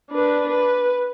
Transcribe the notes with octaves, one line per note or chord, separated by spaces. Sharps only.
D4 B4
B4